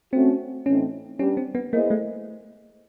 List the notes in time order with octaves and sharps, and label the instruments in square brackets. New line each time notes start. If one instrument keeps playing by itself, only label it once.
[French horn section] A3 C#4 F#4 [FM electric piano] C4
[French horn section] A2 E3 A3 C4 D#4 [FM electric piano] C#4
[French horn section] G3 B3 D4 G4 [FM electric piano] C#4
[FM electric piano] C4
B3
[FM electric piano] A#3 [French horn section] B3 E4 G#4 C5 D#5
[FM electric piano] A3